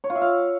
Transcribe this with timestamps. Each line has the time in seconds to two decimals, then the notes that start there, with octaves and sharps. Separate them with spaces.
0.04 C#5
0.10 F4
0.16 E5
0.22 F5